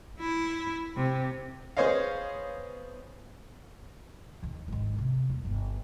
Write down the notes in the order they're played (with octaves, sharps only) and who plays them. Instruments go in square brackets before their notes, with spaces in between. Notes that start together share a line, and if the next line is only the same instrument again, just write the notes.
[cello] E4
C3
[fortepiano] B3 G#4 C5 C#5 D#5 F5
[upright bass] D#2 D#3
G#1 D#3
C3
D#1
G1